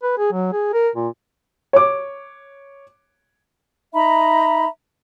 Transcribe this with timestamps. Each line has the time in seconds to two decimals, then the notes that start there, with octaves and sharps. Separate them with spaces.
0.03 B4
0.18 G#4
0.33 F#3
0.52 G#4
0.73 A#4
0.95 A#2
1.73 C#5 D6
3.94 D#4 E5 A#5 B5